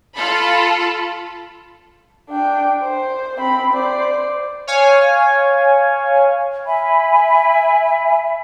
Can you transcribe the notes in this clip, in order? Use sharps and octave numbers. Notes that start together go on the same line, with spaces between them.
F4 A4 B5
D4 G5
C5
C4 B5
C5 D5
C#5 F5 G#5
E5 G#5 B5